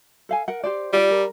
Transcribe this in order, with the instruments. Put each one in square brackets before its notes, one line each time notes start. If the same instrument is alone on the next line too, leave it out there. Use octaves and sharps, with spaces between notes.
[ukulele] A4 F5 G#5
A#4 F#5
G4 C5 D5
[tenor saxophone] G3 [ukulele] F4 G4 D5
[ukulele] A#4